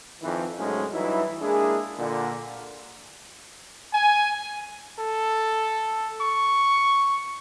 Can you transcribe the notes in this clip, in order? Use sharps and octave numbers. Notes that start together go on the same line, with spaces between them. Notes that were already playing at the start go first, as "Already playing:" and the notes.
F2 D#3 E3
C2 G#2 F#3 G#3 A3 C#4
G2 E3 F#3 D#4 E4
G#3 A#3 D4 E4 G#4
A#2 D3
G#5
A4
C#6